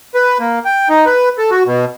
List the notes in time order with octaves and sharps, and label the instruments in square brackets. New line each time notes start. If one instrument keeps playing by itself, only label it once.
[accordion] B4
A#3
G5
D#4
B4
A4
F#4
B2